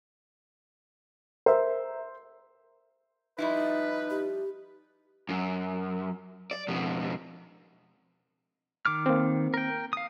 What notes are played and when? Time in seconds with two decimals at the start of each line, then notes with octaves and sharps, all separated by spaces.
1.46 A#4 C5 E5
3.38 F3 G3 D#4 E4 B4
4.10 G4
5.29 F#2
6.51 D5
6.68 F2 B2
8.85 D#3 D6 F6
9.06 A#3 C4
9.54 A#4 G5
9.93 F5 D#6